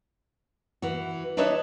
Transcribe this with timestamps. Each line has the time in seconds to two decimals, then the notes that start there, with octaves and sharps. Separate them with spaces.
0.82 E3 F#4
1.37 D4 D#4 B4 C#5 D#5 E5